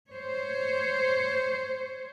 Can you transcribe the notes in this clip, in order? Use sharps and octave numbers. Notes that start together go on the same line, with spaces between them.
C5 C#5